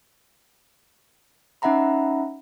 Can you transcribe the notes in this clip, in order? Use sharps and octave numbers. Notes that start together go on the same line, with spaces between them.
C#4 D#4 E5 F#5 A#5 B5